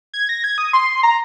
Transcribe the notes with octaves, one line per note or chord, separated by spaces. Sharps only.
G#6
A#6
G#6
D#6
C6
A#5